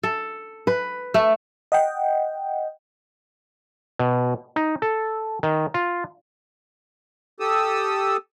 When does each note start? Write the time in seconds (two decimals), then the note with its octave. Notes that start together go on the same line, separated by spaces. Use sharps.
0.03 A4
0.67 B4
1.14 A3
1.72 D#5 F#5 G5
3.99 B2
4.56 D#4
4.82 A4
5.43 D#3
5.74 F4
7.40 G4 A4 D#6 E6